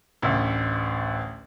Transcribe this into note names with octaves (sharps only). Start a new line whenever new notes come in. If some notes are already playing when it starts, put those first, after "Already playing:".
A1 D2